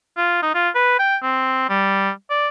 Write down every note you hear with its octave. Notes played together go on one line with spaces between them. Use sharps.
F4
D#4
F4
B4
G5
C4
G3
D5